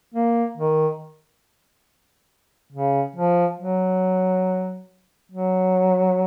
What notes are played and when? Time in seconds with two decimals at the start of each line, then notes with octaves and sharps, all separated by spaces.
0.14 A#3
0.57 D#3
2.72 C#3
3.16 F3
3.59 F#3
5.32 F#3